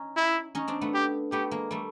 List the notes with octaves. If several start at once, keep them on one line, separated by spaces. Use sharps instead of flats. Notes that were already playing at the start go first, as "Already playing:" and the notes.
Already playing: C#4 D#4
E4
C#4 D#4
C4 D4
A3 B3
G4
A3 B3 G4
G#3 A#3
G3 A3